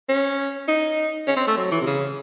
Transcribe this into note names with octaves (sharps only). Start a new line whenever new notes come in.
C#4
D#4
C#4
C4
A3
F#3
E3
C3
C#3